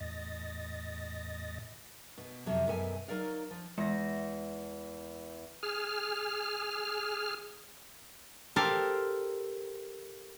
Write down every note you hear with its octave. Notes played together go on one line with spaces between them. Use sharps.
E2 A2 D#5 A6 A#6
B2
F2 C3 F3 F#3
F#2 B2 A4 G#5
F#3 D#4 A#4 D5 F5
F3
E2 G#3 A#6
G#4 F6
G4 A4 A#4 C5 F5